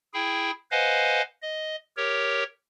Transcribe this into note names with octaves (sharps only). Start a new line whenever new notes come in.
E4 G#4 G5
B4 C5 D#5 F5 F#5 G#5
D#5
G4 A#4 C#5